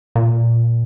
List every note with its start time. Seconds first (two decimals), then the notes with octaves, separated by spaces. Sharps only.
0.15 A#2